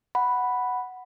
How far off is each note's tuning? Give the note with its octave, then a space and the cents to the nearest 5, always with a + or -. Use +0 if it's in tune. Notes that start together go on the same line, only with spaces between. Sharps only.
F#5 +0 B5 +0